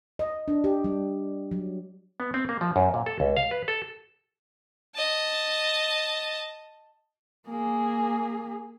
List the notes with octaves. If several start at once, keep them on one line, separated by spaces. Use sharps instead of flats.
D#5
D4
G4
G3
F#3
B3
C4
A#3
F3
F#2
A#2
A4
C#2
F5
B4
A4
D#5 A5
A#3 G#4